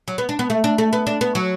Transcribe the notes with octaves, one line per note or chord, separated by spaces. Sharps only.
F#3
B3
D4
B3
A3
D4
A3
B3
D4
B3
F#3